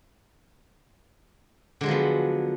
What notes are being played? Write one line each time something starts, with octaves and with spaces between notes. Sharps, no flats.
D3 F3 F#3 G#3 B3